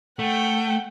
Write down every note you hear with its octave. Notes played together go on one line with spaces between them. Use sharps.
A3 F#5 G5